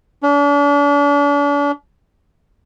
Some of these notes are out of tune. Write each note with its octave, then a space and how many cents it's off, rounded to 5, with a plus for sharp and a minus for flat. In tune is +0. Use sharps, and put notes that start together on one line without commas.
D4 -40